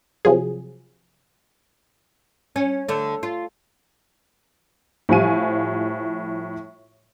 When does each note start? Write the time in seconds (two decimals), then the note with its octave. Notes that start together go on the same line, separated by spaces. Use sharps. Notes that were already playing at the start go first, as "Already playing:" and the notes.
0.25 C3 F3 F#3 G#4
2.56 C#4
2.88 D3 A3
3.23 F4
5.09 A2 F3 G3 F5 G#5 D#7